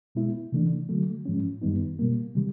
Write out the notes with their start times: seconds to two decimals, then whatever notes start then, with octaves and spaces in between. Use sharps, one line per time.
0.15 B2 G#3 B3 E4
0.52 C3 E3 A3 D4
0.89 D3 F#3 A3
1.25 G#2 F3 G#3 C#4
1.62 F#2 D#3 G3 B3 D#4
1.99 B2 G3 A#3
2.35 C3 D#3 G3